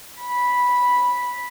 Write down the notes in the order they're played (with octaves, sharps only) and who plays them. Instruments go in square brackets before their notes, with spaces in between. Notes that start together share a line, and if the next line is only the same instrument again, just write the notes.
[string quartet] B5